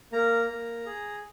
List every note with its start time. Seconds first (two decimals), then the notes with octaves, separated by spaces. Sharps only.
0.13 A#3 A#5
0.50 A#3
0.86 G#4